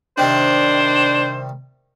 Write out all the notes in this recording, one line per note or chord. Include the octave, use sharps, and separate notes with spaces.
C3 D#3 G3 D4 C5